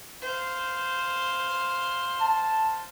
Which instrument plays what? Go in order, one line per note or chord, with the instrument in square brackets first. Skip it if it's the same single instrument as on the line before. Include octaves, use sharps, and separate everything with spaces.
[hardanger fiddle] C5 F5
[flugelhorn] A5